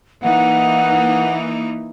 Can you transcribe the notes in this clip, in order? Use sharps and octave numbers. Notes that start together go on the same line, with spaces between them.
E3 A#3 D#4 F#5